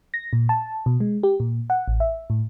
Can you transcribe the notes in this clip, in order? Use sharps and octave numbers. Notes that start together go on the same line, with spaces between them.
A#6
A#2
A5
B2
G#3
G4
A#2
F#5
A1
E5
A2